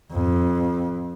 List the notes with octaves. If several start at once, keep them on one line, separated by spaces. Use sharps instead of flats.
F2